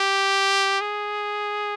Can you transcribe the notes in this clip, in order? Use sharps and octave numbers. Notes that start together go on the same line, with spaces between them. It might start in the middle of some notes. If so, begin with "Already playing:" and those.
Already playing: G4
G#4